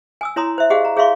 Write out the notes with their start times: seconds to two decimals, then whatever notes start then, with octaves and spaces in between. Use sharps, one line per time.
0.21 G#5 D#6 E6
0.36 E4 C#5 A#5 C6 D#6
0.58 C5 E5
0.70 G4 G#4 C5 D#5 F5 F#5
0.85 A#5
0.97 G#4 C#5 E5 F5 C6 C#6